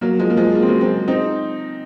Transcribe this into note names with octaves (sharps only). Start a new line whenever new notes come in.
F#3 A#3
F3 G#3
A#3
F3 G#3
A#3
C4
F#3 A#3
G#3 C4
C4 D#4